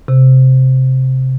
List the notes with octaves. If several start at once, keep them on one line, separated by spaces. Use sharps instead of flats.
C3